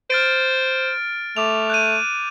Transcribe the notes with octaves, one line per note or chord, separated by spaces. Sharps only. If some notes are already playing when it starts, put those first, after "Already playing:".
C5 F6 A6 D7
A3 D6 F7
F#6 G6 D#7